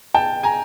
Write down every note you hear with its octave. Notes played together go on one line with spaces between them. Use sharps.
G5 A5
G#5 A#5